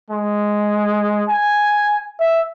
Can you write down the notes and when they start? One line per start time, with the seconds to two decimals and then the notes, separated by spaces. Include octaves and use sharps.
0.10 G#3
1.29 G#5
2.20 E5